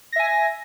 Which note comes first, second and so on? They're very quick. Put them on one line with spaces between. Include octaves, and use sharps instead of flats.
A#6 E5 G#5